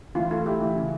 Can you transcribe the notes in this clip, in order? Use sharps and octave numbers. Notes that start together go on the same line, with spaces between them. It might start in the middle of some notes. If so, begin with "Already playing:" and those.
E3 F4
A3 F4
E4 G4
E3
C#3